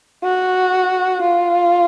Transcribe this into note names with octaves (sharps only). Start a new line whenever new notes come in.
F#4
F4